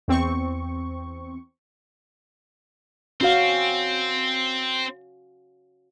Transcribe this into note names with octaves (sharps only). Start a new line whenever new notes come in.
E2 C4 C#6
C4 C#4 F#4 F5